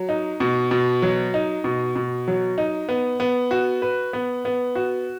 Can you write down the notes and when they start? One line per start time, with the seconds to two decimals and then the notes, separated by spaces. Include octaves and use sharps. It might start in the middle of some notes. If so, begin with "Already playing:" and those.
Already playing: F#3
0.09 D#4
0.40 B2
0.71 B2
1.02 F#3
1.34 D#4
1.64 B2
1.96 B2
2.28 F#3
2.58 D#4
2.89 B3
3.20 B3
3.51 F#4
3.82 B4
4.13 B3
4.45 B3
4.75 F#4